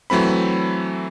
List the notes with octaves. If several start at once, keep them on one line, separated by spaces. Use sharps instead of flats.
E3 F#3 A3 C4 B5